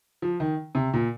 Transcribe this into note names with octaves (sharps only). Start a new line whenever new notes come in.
F3
D#3
C3
A#2